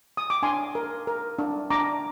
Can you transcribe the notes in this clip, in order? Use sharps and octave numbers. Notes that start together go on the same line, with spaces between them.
D#6
D6
D4 G#5 C6
A#4
A#4
D4
D4 A#5 D6